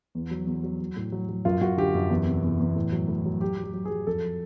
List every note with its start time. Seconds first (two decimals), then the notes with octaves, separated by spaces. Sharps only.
0.15 E2
0.31 F#3
0.47 E2
0.64 F#3
0.80 F#3
0.96 A2
1.12 F#3
1.29 F#3
1.45 F#2 F4
1.61 F#2 F#4
1.77 D3 G4
1.95 F#2
2.10 E2
2.27 C3
2.43 E2
2.60 E2
2.76 A2
2.92 F#3
3.08 A2
3.26 F#3
3.41 F#3 G4
3.58 F#3
3.63 G4
3.74 F#3
3.85 F#3 G#4
4.07 F2 A4